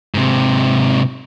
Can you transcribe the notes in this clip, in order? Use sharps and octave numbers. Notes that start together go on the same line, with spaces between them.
G#2 C3